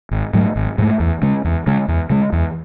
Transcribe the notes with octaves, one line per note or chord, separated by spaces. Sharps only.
G#1
G#2 F#3 A3
G#1
G#2 F#3 A3
E2
C#3 G#3
E2
C#3 G#3
E2
C#3 G#3
E2